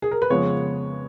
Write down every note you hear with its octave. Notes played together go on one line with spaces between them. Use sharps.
G#4
A#4
B4
F2 C#3 F3 G#3 B3 C#5